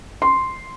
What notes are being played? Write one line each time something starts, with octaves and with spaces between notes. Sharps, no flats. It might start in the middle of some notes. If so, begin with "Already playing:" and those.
C6